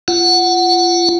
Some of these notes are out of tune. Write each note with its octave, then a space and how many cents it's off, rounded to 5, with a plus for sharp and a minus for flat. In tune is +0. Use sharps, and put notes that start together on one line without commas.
F4 -25 F#5 +0